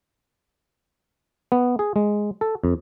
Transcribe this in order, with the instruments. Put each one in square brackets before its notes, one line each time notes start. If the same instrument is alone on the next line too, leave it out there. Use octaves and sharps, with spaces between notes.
[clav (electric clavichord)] B3
G#4
G#3
A4
F2